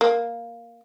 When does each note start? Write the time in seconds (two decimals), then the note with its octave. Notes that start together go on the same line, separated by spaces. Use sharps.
0.01 A#3